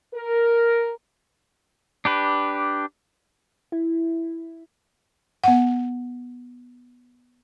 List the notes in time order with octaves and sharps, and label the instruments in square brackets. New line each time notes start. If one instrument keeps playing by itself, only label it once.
[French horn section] A#4
[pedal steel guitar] D4 G4 B4
[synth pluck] E4
[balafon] B3 F#5